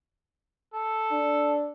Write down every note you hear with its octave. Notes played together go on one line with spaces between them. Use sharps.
A4
D4